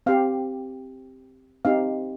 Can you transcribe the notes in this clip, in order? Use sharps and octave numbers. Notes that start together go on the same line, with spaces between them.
C4 G4 F5
C4 D#4 G4 F5